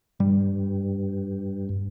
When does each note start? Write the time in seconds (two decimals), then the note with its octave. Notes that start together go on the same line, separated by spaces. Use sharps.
0.20 G2 G3